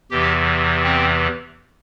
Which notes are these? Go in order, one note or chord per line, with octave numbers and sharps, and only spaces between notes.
E2 C3 E3 G4
C4